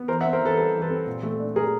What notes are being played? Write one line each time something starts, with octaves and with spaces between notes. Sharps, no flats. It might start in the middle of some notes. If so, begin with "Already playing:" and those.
Already playing: B3
E3 A#4 C5
E5 F#5
C4
A#4 C5
E3 A4 B4
G3 A4 B4
E3
A4 B4
C4
A#2
A3
D4
F#3 G#4 A#4